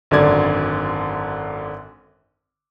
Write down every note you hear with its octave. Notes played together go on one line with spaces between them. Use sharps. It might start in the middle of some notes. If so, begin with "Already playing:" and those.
G#1 F#2 D3 D5 G#6